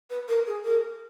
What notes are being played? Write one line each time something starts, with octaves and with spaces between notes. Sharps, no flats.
B4
A#4
G#4
A#4